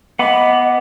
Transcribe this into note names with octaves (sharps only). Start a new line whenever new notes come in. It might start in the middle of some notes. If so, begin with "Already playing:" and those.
B3 D#5 F#5 B5 D6